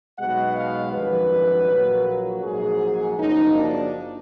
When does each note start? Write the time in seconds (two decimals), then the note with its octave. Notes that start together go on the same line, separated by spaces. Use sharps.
0.19 B1 B2 G#3 F#5
0.56 F5
0.93 G#1 F#2 D3 F3 B4
1.68 A#1 A#2 F#3 A#3
2.43 A#1 G#2 F#3 G#4
3.18 F#1 F#2 F3 A#3 D#4
3.56 D4